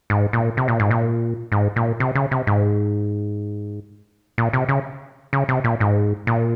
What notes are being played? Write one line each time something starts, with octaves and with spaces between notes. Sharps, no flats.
G#2
A#2
C3
A#2
G#2
A#2
G#2
A#2
C3
C#3
C3
G#2
A#2
C3
C#3
C#3
C3
A#2
G#2
A#2